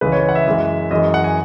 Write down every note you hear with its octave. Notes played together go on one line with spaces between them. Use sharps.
C#2 C#3 E3 G#3 B4
C#5
F#5
E5
F#2 E3 G#3
F#2 E3 G#3 D#5
F#5
G#5